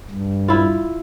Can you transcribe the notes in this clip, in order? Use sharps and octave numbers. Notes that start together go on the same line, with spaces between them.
G2
E4 F4